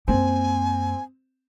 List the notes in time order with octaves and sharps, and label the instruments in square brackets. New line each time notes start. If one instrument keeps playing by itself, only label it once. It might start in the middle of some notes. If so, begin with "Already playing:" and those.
[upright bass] F#2 A#3 [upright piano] C4 [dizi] G#5